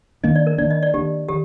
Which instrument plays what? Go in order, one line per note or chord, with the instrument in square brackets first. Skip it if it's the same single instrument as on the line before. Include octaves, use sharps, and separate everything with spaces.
[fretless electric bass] D#3 A#3 D4 [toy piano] D#5
[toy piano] D5
A#4
[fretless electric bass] D#3 A#3 D4 [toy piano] D5
[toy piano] D#5
D5
[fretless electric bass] D#3 A#3 D4 [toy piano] G4
[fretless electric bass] D#3 [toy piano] G4